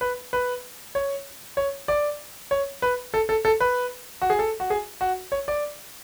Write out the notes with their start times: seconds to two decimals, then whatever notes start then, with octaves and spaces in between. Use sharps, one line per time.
0.01 B4
0.33 B4
0.95 C#5
1.57 C#5
1.88 D5
2.51 C#5
2.82 B4
3.14 A4
3.29 A4
3.45 A4
3.60 B4
4.22 F#4
4.30 G#4
4.39 A4
4.60 F#4
4.70 G#4
5.01 F#4
5.32 C#5
5.48 D5